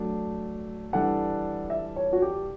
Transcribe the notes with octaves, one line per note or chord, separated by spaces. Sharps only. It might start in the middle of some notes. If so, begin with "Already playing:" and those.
Already playing: F#3 A3 D4
E3 G3 D4 A4 F#5
E5
C#5
F#4
G4